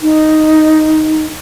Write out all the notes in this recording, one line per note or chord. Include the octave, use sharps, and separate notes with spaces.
D#4